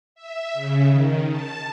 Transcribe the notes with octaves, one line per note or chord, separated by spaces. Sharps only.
E5
C#3
D#3
A5